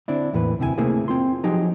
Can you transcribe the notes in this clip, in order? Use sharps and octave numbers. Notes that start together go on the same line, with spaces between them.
D3 C4 D4 E4
E2 A2 E3 A#3 B4
D2 C3 E4 G4 G#5
C3 A3 A#3 C4 E4 G#4
C4 F4 C6
F3 F#3 D#4 G4 G#4